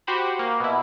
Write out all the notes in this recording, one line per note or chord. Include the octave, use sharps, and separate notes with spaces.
F#4 G4 C5 B5
A#3
B2 E4